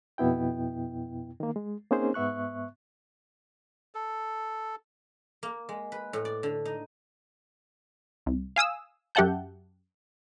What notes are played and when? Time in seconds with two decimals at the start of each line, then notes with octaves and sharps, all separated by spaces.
0.18 F2 B2 B3 E4 G5
1.40 D#3 A#3
1.56 G#3
1.91 A#3 C4 C#4 D#4 G#4 C5
2.14 G#2 B3 E5 C#6 F#6
3.95 A4
5.43 A#3
5.69 G#3
5.92 B4
6.13 A2
6.25 D5
6.43 D3
6.65 D#4
8.26 C2
8.56 F5 G#5 D#6 E6
9.15 F#2 G4 E5 F#5 A5 G6